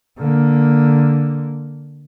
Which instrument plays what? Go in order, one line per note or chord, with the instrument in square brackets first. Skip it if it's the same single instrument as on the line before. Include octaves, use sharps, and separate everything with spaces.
[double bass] D3 A#3